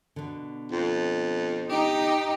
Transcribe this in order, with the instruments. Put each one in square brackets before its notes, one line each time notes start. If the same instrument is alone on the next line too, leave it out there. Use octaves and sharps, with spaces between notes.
[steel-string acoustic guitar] B2 D3
[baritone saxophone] F2
[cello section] D#4 [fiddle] G4